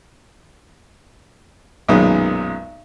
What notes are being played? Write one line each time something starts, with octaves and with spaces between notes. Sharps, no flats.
B1 F#2 A#2 D#3 G#3 B3